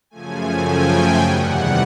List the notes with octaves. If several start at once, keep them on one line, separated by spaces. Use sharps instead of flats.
F#2 C#3 F3 A3 G#5
G5
E2 C3 D#3 G3 F#5